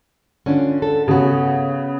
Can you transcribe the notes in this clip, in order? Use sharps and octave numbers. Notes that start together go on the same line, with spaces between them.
D3 C#4 D4 F4
A4
C#3 B3 C#4 F#4